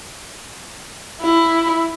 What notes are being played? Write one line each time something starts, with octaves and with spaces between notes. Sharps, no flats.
E4